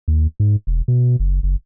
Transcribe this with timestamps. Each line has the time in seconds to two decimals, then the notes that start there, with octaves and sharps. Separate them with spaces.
0.08 D#2
0.40 G#2
0.67 E1
0.88 B2
1.19 F#1
1.43 F#1